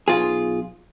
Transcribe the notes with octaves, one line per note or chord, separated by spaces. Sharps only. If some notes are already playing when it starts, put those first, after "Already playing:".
B1 F4 G#4